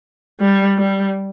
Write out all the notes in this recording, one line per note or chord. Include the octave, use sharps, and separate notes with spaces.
G3
G3